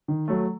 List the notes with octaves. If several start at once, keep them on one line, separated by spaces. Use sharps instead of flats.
D#3
F#3 A3